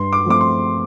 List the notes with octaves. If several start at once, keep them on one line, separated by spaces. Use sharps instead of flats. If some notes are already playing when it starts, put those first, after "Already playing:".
Already playing: G2 C6
D6
F3 A3 C4 D6
C6